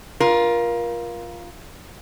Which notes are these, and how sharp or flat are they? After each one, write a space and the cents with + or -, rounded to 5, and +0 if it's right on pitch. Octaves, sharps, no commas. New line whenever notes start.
F4 +0 A#4 +25